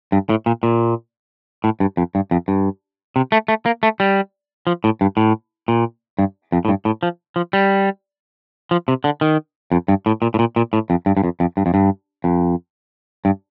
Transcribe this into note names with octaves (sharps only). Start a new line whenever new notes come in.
G2
A2
A#2
A#2
A2
G2
F2
G2
F2
G2
C3
A3
A3
A#3
A3
G3
F3
A2
G2
A2
A#2
G2
F2
A2
G2
A2
F3
F3
G3
F3
C3
D3
D#3
F2
G2
A2
A#2
A2
A#2
A#2
A2
F2
G2
G2
F2
F2
G2
F2
G2
F2
G2